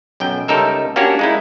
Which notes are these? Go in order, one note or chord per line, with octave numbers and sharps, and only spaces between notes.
B1 F#2 G5
C#2 G3 D#4 A4 A#4 E5
A#3 C#4 D4 F#4 G4
G#3 D#4 E4